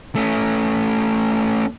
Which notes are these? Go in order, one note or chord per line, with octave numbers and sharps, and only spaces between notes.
A3 C#4